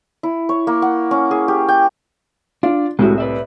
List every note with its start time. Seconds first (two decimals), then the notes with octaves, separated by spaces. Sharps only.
0.23 E4
0.49 C#5
0.67 A#3
0.82 F#5
1.11 C#4
1.31 G#4
1.48 G4
1.69 G5
2.63 D4 F4
2.99 C2 A2 G#3 E4 F#4
3.18 B4 D5 E5